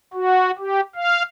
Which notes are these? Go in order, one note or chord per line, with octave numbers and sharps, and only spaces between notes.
F#4
G4
F5